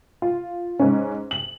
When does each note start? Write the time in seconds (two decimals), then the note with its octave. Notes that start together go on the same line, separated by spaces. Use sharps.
0.22 F4
0.79 G#2 C#4
1.31 F#7